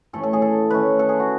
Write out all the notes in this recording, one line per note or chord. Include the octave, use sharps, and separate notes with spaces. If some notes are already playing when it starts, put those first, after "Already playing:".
A2 E3 A3 C#4 A4
A4
G#4
A4
D#3 A3 C#4 B4
A4
G#4
F#4